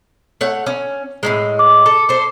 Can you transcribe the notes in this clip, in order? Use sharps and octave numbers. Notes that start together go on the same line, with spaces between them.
A3 C#5 F#5
C#4
A2 C3 G#3
D6
A4
A4 C5